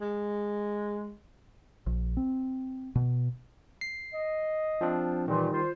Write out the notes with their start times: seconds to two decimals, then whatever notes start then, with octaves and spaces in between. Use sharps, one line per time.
0.01 G#3
1.86 A#1
2.17 C4
2.95 B2
3.81 C7
4.14 D#5
4.81 F3 C4 D4
5.28 A#2 D#3 E3 G3
5.53 F4 C5